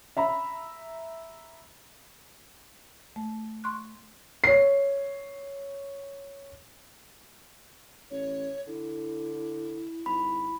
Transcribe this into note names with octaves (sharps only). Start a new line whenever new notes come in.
E5 A#5 B5
A3
C6 C#6 F#6
C#5 C7
A1 C#5
D3 E4
G#1 B5